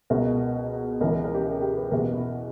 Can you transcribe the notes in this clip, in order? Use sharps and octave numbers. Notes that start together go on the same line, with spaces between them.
C#2 B2 A#4
C#2 C#3 E3 A#4
A#4
A#4
G4
A#4
G4
B4
E2 B2 A#4
E4